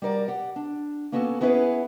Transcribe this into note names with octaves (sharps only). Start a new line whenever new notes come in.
G3 F#4 A#4 D5
G4 F#5
D4
A#3 B3 C#4 F#4 G4 A4
B3 C#4 E4 G#4 B4